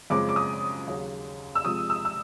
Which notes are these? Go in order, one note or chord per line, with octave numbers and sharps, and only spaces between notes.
F#2 C#3 F3 G#3 C4 D6
D6
D#6
D#2 C#3 F#3
E6
C3 F3 G#3 D#6
E6
E6